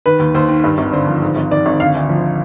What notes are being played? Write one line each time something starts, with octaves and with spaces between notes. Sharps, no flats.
D#3 B4
D#2
D#2 C5
D#3
G2
G#1
D3 C5
F3
G#2
G#1
D#3 D5
G#1
D3 F5
D2
F3